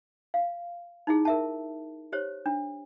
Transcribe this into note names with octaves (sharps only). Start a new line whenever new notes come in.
F5
D#4 E4 G#4
A#4 E5 A5
G4 C5 C#5
D4